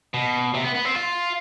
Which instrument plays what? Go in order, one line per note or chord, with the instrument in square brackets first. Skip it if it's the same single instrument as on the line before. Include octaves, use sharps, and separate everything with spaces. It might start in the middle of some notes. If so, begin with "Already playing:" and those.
[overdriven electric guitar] B2
C3
B3
B3
C4
F4